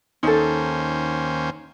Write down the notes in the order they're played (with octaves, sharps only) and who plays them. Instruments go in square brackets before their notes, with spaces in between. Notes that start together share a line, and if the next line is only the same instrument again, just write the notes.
[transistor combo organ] D#2 C#4 C5 [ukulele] D#4 A4